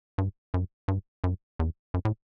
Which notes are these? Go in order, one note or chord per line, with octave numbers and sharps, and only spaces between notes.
G2
F#2
G2
F#2
E2
F#2
A2